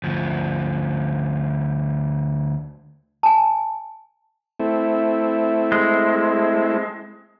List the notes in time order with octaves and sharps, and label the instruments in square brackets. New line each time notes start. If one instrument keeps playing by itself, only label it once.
[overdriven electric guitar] D2 F3
[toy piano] G#5 A5
[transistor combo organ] A3 C4 E4
[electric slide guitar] G#3